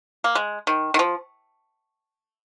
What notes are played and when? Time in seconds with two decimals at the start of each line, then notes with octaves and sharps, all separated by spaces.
0.24 A#3
0.35 G#3
0.67 D#3
0.94 D#3
0.99 F3